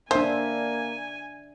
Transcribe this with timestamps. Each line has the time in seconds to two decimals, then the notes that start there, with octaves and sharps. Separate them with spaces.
0.11 A#3 D4 C5 E5 G#5